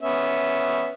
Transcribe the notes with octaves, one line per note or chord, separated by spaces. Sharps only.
B3 C#4 E5